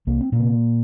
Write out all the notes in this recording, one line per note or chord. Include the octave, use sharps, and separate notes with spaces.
C2 A#3
C4
A#2 A#3
C3